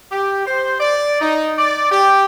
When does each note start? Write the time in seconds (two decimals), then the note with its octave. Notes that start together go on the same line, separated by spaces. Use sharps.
0.12 G4
0.46 C5
0.80 D5
1.21 D#4
1.58 D5
1.91 G4